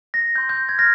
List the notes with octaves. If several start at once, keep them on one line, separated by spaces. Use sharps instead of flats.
A#6
C6 G6
G6
G#6
F6 A#6